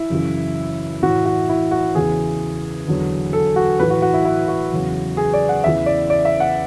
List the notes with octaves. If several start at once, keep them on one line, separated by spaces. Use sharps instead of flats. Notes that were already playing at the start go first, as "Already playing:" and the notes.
Already playing: E4
F#2 C#3 E3
A2 E3 F#4
F#4
E4
F#4
E2 C#3 E3 G#4
E2 D3 F#3
A4
F#4
A2 E3 B4
F#4
F#4
E4
E4
F#4
E2 C#3 F#3
G#4
D5
F#5
E2 C#3 E3 E5
D5
D5
E5
F#5